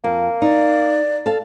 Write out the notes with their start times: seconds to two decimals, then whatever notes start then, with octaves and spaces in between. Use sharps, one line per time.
0.04 F2 A#3
0.42 D#4 D5
1.26 A4 F5 A5